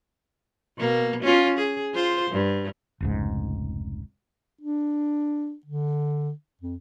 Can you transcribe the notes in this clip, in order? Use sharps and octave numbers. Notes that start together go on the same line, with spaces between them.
B2 A#3
C#4 F4
G#4
F4 C5
G2
F1 C#2 G#2
D4
D3
F2